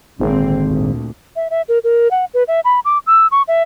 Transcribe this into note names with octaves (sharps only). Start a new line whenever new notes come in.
G#1 A#2 D3 C4
D2 A#2
E5
E5
A#4
A#4
F#5
B4
E5
B5
D6
E6
C#6
E5